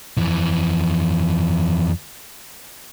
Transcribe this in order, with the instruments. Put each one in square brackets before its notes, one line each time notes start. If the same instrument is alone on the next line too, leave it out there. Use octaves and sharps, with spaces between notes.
[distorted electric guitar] F2 E3